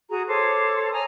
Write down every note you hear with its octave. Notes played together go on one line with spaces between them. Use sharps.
F#4 G#4 A#5
A4 C5 C#5 D6
C#5 G#5 A#5 D#6